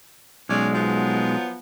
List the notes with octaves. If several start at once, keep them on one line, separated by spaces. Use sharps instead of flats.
B1 G#3 C#4 D5
F3 F#3 B3